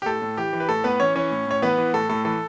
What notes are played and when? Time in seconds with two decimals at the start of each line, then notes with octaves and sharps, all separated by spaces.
0.02 G4
0.06 A2 A4
0.22 A2
0.37 E3 G4
0.53 E3
0.60 B4
0.69 A2 A4
0.84 A2 B3 B4
1.00 E3 C#4 C#5
1.15 E3 C#4 C#5
1.31 A2
1.47 A2 C#5
1.62 E3 B3 B4
1.78 E3
1.93 A2 A4
2.09 A2 A4
2.25 E3 A4